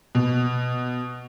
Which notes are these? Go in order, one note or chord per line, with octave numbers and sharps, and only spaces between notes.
B2